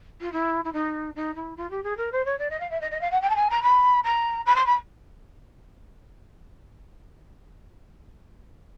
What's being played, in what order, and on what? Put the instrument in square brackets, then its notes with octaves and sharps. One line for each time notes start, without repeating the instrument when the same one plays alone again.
[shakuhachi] F4
E4
E4
D#4
D#4
E4
F4
G4
G#4
A#4
C5
C#5
D5
D#5
F5
E5
D#5
D#5
F5
F#5
G5
A5
G#5
A#5
B5
A#5
B5
C6
B5